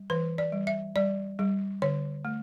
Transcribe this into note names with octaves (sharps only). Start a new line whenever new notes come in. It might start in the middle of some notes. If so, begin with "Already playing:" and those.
Already playing: G3
E3 B4
D5
G3
E5
G3 D5
G3
D3 C#5
A3